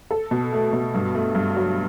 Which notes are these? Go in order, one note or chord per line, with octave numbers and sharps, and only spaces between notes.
A4
B2
A3
B2
G2
A3
G2
F#3